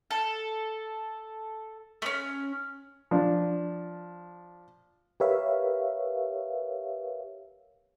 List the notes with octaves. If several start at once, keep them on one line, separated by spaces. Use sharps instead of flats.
A4
A3 C#4
F3 D4
G4 A#4 B4 C#5 E5 F5